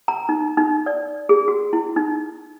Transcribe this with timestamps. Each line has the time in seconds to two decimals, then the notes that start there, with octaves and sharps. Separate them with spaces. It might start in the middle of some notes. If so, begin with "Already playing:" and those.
0.08 A#5
0.29 D#4
0.57 D#4
0.86 D5
1.29 G#4
1.48 F#4
1.73 E4
1.96 D#4